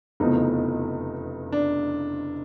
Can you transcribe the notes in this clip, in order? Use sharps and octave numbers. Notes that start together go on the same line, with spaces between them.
F1 E2 C#3 F3 D#4
D4